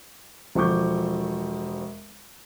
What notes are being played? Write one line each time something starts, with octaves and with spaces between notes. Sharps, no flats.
E1 F3 A3 C#6 D6 G6